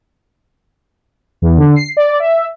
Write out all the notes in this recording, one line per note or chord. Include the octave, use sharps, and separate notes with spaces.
E2
D3
C7
D5
E5